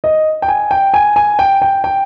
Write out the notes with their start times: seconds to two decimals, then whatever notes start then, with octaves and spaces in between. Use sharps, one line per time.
0.04 D#5
0.42 G5
0.48 G#5
0.71 G5
0.94 G#5
1.16 G#5
1.39 G5
1.62 G5
1.84 G5